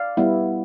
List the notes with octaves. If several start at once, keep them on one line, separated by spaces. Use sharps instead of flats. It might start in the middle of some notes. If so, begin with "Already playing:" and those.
Already playing: D5 F5
G3 B3 E4